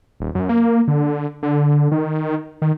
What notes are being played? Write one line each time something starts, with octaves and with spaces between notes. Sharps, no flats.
D#1
F#2
A#3
D3
D3
D#3
D#3